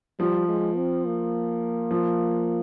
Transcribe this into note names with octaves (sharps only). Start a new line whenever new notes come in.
F3 G3
G#3
C4
A#3
F3